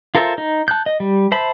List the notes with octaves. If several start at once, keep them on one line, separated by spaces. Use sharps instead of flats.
F4 A4 A#4 C5 E5
D#4
A5 F#6 G6
D#5
G3
C5 E5 A5 B5